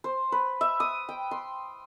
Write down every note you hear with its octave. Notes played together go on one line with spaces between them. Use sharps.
C5
B4
E5
D#6
G5
C6